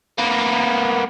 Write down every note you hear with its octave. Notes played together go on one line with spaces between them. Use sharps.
A#3 B3